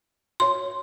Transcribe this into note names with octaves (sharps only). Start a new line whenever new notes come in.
F#4 C#5 C6